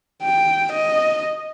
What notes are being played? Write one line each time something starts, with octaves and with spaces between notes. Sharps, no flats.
G5
D#5